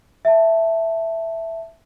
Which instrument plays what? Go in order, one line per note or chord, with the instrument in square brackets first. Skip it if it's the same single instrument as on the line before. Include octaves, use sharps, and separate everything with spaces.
[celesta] E5 A5